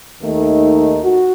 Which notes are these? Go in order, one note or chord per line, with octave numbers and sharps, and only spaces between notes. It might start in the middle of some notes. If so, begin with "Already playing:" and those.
D#2 D#3 A3 D#4
F#4